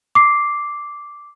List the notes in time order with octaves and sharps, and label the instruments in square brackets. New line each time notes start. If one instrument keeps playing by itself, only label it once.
[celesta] D6 C7